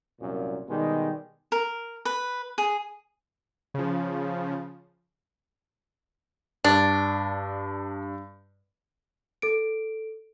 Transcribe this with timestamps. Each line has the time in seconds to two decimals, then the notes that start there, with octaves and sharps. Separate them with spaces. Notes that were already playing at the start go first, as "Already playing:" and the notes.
0.20 C2 F#2 A#2
0.68 B2 D#3 G3 G#3 G4
1.52 A#4
2.05 B4
2.58 G#4
3.74 C#3 F3
6.64 G2 D4
9.42 A4 D7